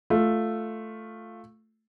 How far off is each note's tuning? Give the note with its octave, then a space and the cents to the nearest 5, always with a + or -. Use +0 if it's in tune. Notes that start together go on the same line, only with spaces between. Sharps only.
A3 +0 F4 +0